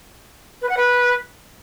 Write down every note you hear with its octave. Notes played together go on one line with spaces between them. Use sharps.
B4
F#5
B4